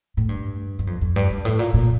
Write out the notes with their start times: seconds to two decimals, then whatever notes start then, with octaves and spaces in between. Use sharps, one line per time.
0.17 A2
0.29 G2
0.79 G2
0.87 F2
1.01 F2
1.16 G2
1.30 G2
1.45 A2
1.59 A#2
1.74 A#2